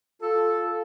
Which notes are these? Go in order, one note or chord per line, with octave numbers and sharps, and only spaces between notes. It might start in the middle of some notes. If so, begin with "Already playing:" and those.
F4 A4